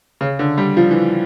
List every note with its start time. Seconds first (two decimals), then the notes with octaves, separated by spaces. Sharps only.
0.21 C#3
0.39 D3
0.58 G3
0.77 F3
0.91 E3